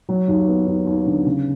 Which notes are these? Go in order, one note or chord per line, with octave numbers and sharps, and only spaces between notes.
F#3
D#2
B3
D#2
D#2
D3
C#3